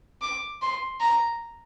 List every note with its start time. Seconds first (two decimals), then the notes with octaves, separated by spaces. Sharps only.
0.22 D6
0.62 C6
1.01 A#5